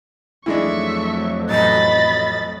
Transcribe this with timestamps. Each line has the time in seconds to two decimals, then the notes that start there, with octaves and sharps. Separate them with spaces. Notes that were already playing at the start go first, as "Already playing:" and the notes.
0.46 F2 E3 F#3 G#3 A3 D4 E5 C#6
1.50 A1 D#5 B5 A6